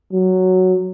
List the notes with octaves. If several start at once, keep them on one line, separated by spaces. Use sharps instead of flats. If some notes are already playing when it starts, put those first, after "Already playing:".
F#3